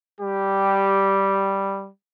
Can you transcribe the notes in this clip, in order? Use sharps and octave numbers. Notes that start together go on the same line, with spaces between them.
G3 G4